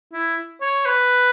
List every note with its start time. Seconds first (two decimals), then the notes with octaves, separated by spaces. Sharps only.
0.13 E4
0.61 C#5
0.86 B4